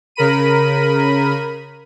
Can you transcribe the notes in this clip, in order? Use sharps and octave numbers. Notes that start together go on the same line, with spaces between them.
C#3 A#4 B5 D#7